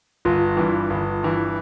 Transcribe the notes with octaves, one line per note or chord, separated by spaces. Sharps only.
G1 F4
G2 E3
G1
G2 E3